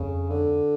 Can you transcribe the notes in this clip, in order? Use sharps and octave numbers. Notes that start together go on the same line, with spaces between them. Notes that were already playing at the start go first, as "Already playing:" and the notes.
Already playing: F2 C#3
D3